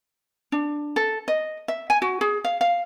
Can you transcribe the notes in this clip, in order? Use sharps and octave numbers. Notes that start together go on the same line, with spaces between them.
D4
A4
D#5
E5
G#5
F#4
G#4
F5
F5